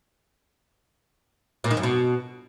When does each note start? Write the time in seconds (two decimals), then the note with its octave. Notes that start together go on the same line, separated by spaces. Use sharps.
1.64 A#2
1.71 D#3
1.77 F#2
1.83 B2